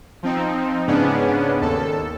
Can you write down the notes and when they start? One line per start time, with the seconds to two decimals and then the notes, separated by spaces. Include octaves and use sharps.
0.23 F3 C4 D#4
0.87 G#2 C#3 B3 C#4 D4
1.61 D#2 A4